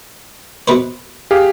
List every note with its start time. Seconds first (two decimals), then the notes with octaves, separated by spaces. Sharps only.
0.68 B2 B4 C5
1.31 G4 G#4 F5